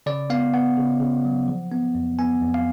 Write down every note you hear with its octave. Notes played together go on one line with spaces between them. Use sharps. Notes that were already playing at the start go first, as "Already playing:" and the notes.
C#3 D5
B3 F5
B3 F#5
C#3
C#3
F#3
F3
B3
F2
B3 G#5
F2
F5